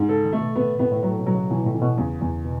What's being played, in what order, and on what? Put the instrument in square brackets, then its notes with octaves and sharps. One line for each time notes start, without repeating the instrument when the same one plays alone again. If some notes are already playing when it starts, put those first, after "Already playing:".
Already playing: [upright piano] G#2
[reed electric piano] C#3 [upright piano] A4
[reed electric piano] D#3
[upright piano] A3
[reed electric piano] B2
[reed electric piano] A2 [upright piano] B3
[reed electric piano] A2 [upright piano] B3
[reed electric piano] A2
[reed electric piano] A2 [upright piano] F#3
[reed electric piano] B2
[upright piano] F#3
[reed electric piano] C#3
[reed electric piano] B2 [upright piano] E3
[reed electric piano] A2
[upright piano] E3
[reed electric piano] B2
[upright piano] E2 [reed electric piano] C#3
[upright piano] E2
[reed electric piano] B2